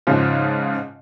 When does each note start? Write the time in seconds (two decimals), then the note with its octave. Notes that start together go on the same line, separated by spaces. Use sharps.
0.07 G#2 C#3 F3